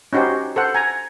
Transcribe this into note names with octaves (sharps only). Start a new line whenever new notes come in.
C#4 D#4 F#4 G4 C5
A4 C5 F#5
G#5 A#5